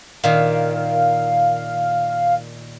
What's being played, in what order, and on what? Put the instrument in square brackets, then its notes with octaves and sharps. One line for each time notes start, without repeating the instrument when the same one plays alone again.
[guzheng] A#2 D#3 [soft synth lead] F5